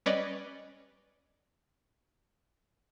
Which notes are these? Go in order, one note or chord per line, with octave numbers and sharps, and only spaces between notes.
G3 C#4 B4 D5 D#5